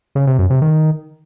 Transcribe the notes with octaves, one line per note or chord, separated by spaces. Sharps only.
C#3
C3
F#2
C3
D#3